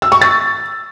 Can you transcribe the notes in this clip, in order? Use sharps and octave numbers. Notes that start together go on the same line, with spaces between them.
E6
C#6
A6